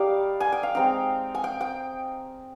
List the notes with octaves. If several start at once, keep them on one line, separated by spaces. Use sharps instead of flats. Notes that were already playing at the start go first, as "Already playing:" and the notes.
Already playing: G3 D#4 D5 F5
G#5
G5
F5
G#3 C4 D#4 G5
G#5
G5
G5